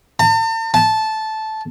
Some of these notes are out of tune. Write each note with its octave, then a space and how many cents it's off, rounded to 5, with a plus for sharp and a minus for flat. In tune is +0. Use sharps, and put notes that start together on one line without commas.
A5 +45
A5 -10